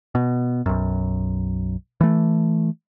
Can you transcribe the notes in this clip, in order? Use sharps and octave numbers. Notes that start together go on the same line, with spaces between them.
B2
B1 F#2
E3 A3